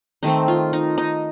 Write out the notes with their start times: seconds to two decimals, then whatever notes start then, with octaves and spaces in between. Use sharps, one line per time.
0.23 D#3 A3 C4 D#4
0.48 F4
0.73 D#4
0.98 D#4